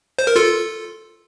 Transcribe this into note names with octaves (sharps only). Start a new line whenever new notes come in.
C5
A#4
F4 A4